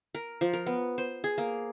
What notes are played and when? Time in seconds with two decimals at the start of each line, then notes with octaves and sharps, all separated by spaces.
0.15 A#4
0.41 F3
0.53 A#4
0.67 B3
0.98 C5
1.24 G#4
1.38 A#3